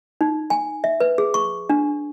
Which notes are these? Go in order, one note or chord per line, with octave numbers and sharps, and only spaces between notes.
D#4
G#5
E5
B4
G#4
C#6
D4